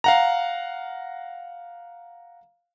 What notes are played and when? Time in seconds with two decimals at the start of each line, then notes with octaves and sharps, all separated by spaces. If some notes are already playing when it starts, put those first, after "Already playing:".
0.04 F5 F#5 A#5